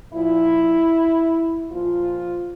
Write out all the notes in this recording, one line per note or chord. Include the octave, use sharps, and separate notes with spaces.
A#2 F3 E4
A#2 F3 F4